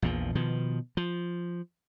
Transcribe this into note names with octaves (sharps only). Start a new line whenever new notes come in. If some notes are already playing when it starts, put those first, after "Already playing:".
A#1 E2 A#2 F3
B2 D#3 F3
F3